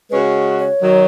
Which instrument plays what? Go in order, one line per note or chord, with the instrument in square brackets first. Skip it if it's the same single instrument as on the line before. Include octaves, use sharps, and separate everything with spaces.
[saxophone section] C#3 G#3 C#4 F#4 [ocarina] B4
[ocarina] C#5
[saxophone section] D#3 F#3